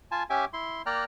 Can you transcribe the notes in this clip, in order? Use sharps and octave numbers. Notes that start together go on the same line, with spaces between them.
F4 G#5 A5
C#4 G4 E5 G#5 D6
E4 C6
A#3 D5 G5 A#5 F6 F#6